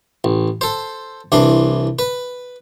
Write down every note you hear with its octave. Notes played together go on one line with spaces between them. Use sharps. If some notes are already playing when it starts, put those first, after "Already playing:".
A1
A4 C5
C2 E3 D4 C6
B4